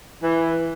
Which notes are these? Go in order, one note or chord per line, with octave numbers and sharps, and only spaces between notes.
E3